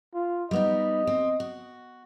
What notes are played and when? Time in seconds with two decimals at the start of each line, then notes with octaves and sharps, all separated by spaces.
0.14 F4
0.51 G3 B3 D#4 D#5
1.07 C4
1.40 F#4